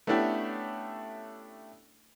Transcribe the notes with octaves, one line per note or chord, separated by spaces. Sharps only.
A3 B3 C#4 D4 E4 G4